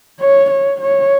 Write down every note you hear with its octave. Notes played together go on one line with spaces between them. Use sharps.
C#5
C#5
C#5